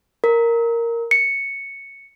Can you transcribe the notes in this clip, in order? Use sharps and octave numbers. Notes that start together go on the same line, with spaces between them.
A#4
C#7